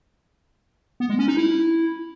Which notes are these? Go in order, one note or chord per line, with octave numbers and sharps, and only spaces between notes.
B3
G#3
C#4
D#4
E4